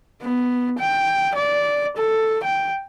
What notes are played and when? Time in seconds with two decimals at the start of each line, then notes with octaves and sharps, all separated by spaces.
0.22 B3
0.79 G5
1.35 D5
1.97 A4
2.44 G5